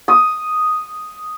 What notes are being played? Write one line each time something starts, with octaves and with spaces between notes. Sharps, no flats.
D#6